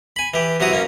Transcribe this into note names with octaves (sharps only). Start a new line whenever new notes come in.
G#5 B5
E3 G4
C3 F#3 E4 F#4 D#6
F#2 A#3 C#4